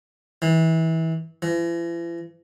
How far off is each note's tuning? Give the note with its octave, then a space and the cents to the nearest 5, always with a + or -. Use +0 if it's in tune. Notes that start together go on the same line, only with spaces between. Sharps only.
E3 -25
E3 +45